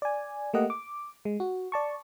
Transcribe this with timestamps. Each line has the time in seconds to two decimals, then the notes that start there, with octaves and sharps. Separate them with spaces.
0.02 D5 G#5
0.54 A3 A#3 G4 D#5 F#5
0.70 D6
1.25 G#3
1.40 F#4
1.72 D5 A5 C#6